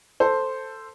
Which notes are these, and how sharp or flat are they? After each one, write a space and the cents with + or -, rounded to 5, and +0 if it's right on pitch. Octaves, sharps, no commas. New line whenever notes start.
A4 +10 C5 +0